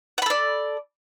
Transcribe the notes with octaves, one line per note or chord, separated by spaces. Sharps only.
A4 D5 F#5 B5